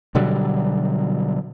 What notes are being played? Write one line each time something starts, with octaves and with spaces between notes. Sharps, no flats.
B2 D3 F#3 G3